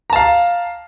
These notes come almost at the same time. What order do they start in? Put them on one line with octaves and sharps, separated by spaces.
A#5 A5 F5